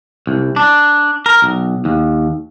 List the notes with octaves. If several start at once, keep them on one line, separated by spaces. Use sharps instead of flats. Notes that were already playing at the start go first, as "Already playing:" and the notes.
C2
D4
A#4
B1
D#2